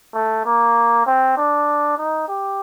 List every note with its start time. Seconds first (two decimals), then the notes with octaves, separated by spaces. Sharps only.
0.14 A3
0.45 A#3
1.06 C4
1.37 D4
1.98 D#4
2.28 G4